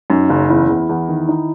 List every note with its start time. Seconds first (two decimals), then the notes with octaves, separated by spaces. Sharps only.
0.10 F#2 D#4
0.30 F#1
0.49 E2 E4
0.69 E2
0.89 E2
1.09 D#3
1.28 D#4